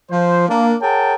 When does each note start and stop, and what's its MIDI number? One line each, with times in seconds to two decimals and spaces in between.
0.10 0.45 53
0.10 0.45 72
0.49 0.74 58
0.49 0.74 62
0.81 1.15 68
0.81 1.15 70
0.81 1.15 73
0.81 1.15 78
0.81 1.15 79
0.81 1.15 81